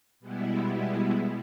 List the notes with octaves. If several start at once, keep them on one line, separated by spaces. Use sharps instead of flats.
B2 G3 G#3 B3 E4